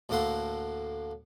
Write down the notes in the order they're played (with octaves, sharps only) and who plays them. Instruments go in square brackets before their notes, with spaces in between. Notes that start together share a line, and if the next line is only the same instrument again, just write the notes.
[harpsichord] D2 A2 A#3 A4 F#5 C6